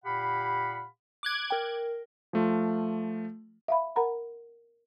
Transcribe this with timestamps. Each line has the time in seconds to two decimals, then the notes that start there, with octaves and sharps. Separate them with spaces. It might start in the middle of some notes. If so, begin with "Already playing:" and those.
0.05 A#2 G4 F5 F#5 B5
1.23 D6 F#6 G#6
1.50 A#4 G5
2.33 F3 A3 F4
3.68 E5 F5 B5
3.96 A#4 F#5 A#5 B5